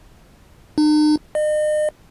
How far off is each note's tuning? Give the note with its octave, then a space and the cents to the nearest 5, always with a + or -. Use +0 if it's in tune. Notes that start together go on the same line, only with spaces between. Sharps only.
D#4 -45
D#5 -40